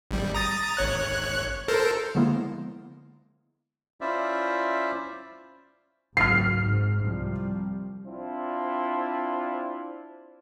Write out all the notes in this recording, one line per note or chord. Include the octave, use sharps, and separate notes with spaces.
G#1 G3
A#5 D#6 A6
G#1 C#5 F#6
A4 A#4 C5
D3 F3 G#3 A#3 B3 E4
C#4 E4 F4 C5 D5 E5
G#1 C#2 F#3 F6 C7
G#2
C2 F3 G3
C4 D4 E4 F4 C5